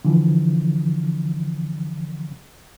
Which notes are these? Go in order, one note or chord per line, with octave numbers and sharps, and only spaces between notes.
D3 E3 F3